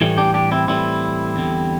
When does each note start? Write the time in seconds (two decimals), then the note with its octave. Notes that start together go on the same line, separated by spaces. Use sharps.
0.01 A2 E3 G3 A3
0.18 D4 G4
0.34 D4 G4
0.51 C4 E4
0.68 A2 E3 G3 C4 E4
1.36 E2 D3 G3